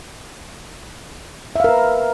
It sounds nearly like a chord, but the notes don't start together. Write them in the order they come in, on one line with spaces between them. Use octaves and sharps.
E5 F5 A#4 B4